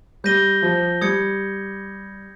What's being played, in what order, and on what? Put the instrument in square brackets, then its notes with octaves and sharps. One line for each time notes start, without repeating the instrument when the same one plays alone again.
[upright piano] G3 [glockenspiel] G6 A#6 D#7 G7
[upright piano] F3
[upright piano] G3 [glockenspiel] D#6 G#6 C#7